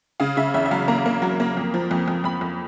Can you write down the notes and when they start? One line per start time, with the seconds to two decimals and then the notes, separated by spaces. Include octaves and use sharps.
0.20 C#3 F5
0.37 C#3 E5
0.54 E2 E5
0.66 E5
0.71 F#3 F5
0.88 A#3 A#5
1.06 A#3
1.22 F#3
1.40 A#3
1.57 F2
1.74 F3
1.91 F2
2.08 F2
2.24 F2 B5
2.41 F2